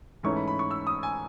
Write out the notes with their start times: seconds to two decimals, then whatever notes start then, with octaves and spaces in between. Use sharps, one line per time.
0.23 G#2 E3 A3 C#4 C#6
0.36 B5
0.48 B5
0.59 C#6
0.71 E6
0.87 D#6
1.03 G#5